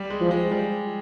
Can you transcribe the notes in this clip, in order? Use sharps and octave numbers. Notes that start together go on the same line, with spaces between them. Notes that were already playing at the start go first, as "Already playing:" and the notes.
Already playing: G3
G#3
F3
G#3
G3